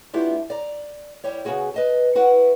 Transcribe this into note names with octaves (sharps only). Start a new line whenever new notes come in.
A3 B3 D4 E4 F4 G4
D5 A#5
G3 E4 G4 C#5
C#3 E3 B3 F#4 G#4
B4 D#5 A5
E4 F#4 B4 F#5